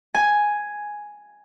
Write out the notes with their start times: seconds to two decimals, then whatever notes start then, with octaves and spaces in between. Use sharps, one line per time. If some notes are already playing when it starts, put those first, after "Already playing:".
0.14 G#5